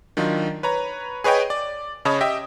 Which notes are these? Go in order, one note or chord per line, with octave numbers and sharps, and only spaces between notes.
D#3 F#3 D4 D#4 F4
B4 C#5 A#5
G#4 B4 C#5 D#5 G5
D5
C#3 C#5 D#5 A5 B5 D#6
G4 D#5 E5 G5